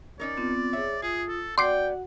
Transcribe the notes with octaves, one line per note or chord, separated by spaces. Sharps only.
C#4 D#4 A#4 D5
B3 C4 F4
G#4 C#5 E5
F4 G#4 D#6
A4
B3 F#4 D5 F#5 G5 C6 D6 C7